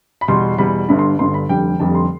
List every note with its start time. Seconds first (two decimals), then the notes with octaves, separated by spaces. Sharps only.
0.21 B5
0.28 E2 B2 G3 C6
0.58 E2 B2 G3 B5
0.88 G1 G2 D3 B5
0.99 C6
1.19 G1 G2 D3 C6
1.34 B5
1.49 F1 F2 D3 G3 G5
1.80 F1 F2 D3 G3 A5
1.95 C6